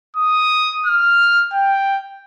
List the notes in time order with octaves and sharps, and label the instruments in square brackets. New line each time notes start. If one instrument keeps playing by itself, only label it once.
[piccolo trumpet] D#6
F6
G5